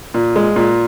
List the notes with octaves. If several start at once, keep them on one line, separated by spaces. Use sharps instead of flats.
A#2
G#3
A#2